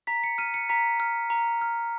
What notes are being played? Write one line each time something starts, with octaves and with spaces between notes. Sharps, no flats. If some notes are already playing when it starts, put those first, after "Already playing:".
A#5 B6
C#7
F6 D#7
C#7
A#5 B6
F6
A#5
F6